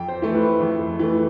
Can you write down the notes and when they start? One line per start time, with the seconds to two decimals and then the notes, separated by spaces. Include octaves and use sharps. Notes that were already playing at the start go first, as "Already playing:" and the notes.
Already playing: F2 G5
0.08 C5
0.22 E3 A3
0.34 B4
0.61 F2
0.99 E3 A3